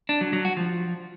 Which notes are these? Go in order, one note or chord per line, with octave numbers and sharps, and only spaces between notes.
D4
F#3
F#3
F#4
F3